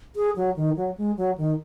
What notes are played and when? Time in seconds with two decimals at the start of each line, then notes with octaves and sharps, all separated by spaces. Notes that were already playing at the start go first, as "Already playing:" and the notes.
0.16 G#4
0.36 F#3
0.56 D#3
0.76 F#3
0.97 G#3
1.17 F#3
1.38 D#3